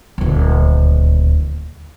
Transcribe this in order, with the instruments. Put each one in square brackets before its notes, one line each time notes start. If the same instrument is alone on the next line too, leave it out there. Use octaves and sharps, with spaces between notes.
[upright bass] D#1 D2